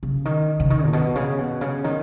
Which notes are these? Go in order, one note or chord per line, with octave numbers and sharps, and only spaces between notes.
C#3
D#3
C#3
D#3
A2
B2
C#3
B2
C#3
D#3